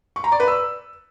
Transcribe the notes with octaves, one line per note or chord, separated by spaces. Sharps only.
C#6
A#5
D5
B4
E6